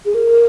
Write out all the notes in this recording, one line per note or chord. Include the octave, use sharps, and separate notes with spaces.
G#4
A#4